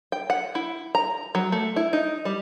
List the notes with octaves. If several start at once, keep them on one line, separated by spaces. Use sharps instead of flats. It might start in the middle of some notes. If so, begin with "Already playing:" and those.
G5
F#5
E4
A#5
F#3
A3
E4
D#4
G3